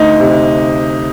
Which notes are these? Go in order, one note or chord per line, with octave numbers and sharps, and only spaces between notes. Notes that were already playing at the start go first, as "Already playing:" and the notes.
Already playing: D2 D#4
C3